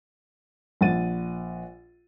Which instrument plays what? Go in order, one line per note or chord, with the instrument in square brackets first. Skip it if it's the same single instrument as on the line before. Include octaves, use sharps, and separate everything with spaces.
[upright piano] A#1 F#5 A6 D#7